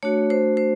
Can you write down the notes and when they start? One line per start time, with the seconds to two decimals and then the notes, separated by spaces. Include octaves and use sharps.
0.03 A3 D4 F#4 C#5
0.30 C5
0.57 C5